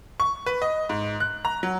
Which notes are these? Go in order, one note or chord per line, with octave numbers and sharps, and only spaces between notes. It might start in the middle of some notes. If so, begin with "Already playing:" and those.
C#6
B4
D#5
G#2
F#6
A#5
F#3